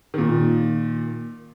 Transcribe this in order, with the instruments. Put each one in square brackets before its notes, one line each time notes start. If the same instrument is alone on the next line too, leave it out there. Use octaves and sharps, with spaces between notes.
[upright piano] A#2 D#3